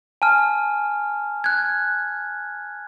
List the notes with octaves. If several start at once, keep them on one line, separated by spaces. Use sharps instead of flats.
G#5 A5 F6
F#6 G#6